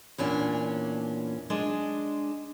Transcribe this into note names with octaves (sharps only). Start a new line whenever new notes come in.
E2 A#2 C#4 D4
G#3 D4 D#5